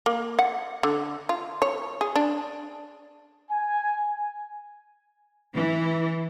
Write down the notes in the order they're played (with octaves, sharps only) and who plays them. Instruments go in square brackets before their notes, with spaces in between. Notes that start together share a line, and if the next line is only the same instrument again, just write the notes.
[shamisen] A#3
F#5
D3
F4
C#5
G#4
D4
[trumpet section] G#5
[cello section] E3